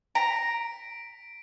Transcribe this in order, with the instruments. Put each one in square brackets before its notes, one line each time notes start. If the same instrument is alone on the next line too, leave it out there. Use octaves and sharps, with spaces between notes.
[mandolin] A#5 [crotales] B6 D7